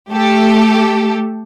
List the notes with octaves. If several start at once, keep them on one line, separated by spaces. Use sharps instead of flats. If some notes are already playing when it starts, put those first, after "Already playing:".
A3 G4 A4